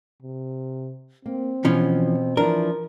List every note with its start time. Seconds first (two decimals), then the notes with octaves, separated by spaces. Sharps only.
0.22 C3
1.26 A#3 C4
1.65 B2 E3 F3 C#4
2.37 E3 F3 D4 A#4